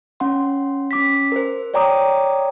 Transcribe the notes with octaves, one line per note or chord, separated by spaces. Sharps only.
C#4 F#5 C6
C#4 D6 B6
A#4 C5
C#5 D5 G5 A#5 D6 D#6